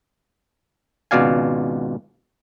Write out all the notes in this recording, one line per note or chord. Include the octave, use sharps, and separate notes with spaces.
G#1 C#2 B2 D5 F5 G#5